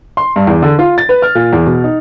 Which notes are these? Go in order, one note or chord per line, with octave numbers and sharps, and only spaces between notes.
C6
G2
E2
D3
F4
A6
B4
F6
A#2
E2
B2
D#4